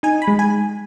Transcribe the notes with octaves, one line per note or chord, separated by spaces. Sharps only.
D#4 G#5
B5
G#3
G#5